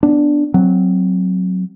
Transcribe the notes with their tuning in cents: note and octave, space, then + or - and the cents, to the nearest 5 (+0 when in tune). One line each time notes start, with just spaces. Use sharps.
B3 +0 D4 +0
F#3 +0 C4 +0